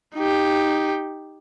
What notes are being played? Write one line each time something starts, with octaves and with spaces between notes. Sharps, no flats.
D#4 G4